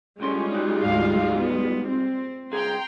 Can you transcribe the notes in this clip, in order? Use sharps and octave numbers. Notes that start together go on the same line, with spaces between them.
C#2 A2 G3 G#3 C#4 F4 C6
D#4 F#4
D2 G#2 F5
B3
C4
C2 G#4 G5 A#5 C6